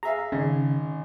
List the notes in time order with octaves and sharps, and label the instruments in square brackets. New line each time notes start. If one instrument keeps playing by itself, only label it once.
[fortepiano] G#4 E5 F5 [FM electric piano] A#5
[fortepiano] G#1 [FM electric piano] C#3